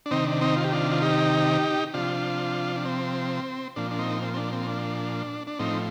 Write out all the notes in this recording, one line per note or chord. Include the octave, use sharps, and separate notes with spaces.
D4
C3 D#3 C4 D#4
D4
C4 D#4
F4
G4
D4 F4
F4
D#4 G4
C3 F3 D4 F4
D4
C4
A#2 F3 D4
D4
C4 D#4
C4
C4
D4
C4
D4
D4
A2 F3 C4 D#4